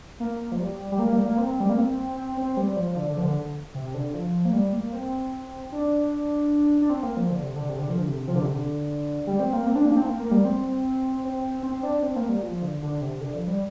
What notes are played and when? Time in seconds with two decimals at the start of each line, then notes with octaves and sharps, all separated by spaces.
0.20 A#3
0.52 F3
0.60 G3
0.92 G3
0.99 A#3
1.13 G3
1.25 A#3
1.38 C4
1.60 G3
1.69 A#3
1.78 C4
2.17 C4
2.37 C4
2.57 G3
2.76 F3
2.96 D3
3.09 D3
3.17 F3
3.22 D3
3.75 C3
3.94 D3
4.14 F3
4.45 A#3
4.53 G3
4.73 A#3
4.93 C4
5.72 D4
6.81 D4
6.90 C4
7.03 A#3
7.17 F3
7.30 D3
7.43 C3
7.56 D3
7.69 C3
7.78 D3
7.89 F3
7.98 D3
8.08 C3
8.28 F3
8.35 D3
8.42 C3
8.50 D3
9.27 G3
9.40 C4
9.53 A#3
9.67 C4
9.75 D4
9.85 A#3
9.92 D4
9.96 C4
10.06 A#3
10.19 A#3
10.31 G3
10.45 C4
11.24 C4
11.63 C4
11.83 D4
12.03 C4
12.16 A#3
12.29 G3
12.42 F3
12.62 D3
12.82 D3
13.01 C3
13.21 D3
13.34 F3
13.47 G3